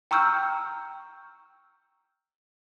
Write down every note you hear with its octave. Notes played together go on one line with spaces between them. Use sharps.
G5 A#5 C#6 E6 F6 G6